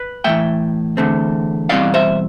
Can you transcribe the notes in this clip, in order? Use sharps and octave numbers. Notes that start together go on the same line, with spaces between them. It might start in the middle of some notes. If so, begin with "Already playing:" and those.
Already playing: B4
A2 E3 A3 E5 G5
E2 D3 A3 C4
E2 B2 G3 C4 E4 D5 F5
C5 E5